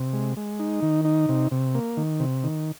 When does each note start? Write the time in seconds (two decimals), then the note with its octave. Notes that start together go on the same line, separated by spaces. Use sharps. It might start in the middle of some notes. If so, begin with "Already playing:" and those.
Already playing: C3
0.13 G#3
0.37 G#3
0.59 D#4
0.82 D#3
1.05 D#4
1.29 C3
1.51 C3
1.75 A#3
1.97 D#3
2.20 C3
2.44 D#3